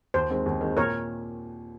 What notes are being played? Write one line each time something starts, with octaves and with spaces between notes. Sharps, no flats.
D#2 C5
D#3 G#3 C4
D#2
D#3 G#3 C4
A#2 A#4 C#5